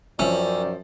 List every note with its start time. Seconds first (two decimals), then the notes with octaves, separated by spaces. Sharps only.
0.19 F#2 D#3 F3 C#4 C5 D5 E5 F#7